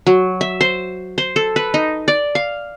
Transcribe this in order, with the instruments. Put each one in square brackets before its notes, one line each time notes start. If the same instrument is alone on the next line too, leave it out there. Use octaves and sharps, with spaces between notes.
[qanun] F#3
E5
C5
C5
A4
B4
D#4
D5
F5